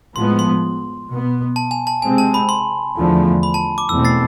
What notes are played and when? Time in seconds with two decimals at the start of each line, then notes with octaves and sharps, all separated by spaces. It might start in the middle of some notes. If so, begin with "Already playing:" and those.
0.15 A2 F3 G#3 B3 C6
0.39 C6
1.08 B2 B3
1.56 A5
1.71 G#5
1.87 A5
2.02 C3 G#3 C4 G#5
2.18 A5
2.34 B5
2.49 C6
2.96 E2 D3 F3 A3
3.43 B5
3.54 A5
3.78 D6
3.89 E2 B2 A3 C4 E6
4.05 A6 C7